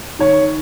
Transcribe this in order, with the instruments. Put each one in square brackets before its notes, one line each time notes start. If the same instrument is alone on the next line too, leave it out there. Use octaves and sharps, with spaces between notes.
[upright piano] D#3 C#5